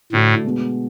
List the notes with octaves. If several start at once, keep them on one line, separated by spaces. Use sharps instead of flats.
A2 D3 A3 D4 F#4
B2 G#3 B3 F#4